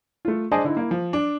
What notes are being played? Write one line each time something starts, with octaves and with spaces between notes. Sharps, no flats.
A3 F4
D4 G#4 C5 D5 D#5 A5
D3 D#4 E4
A#3 E4
F3
D4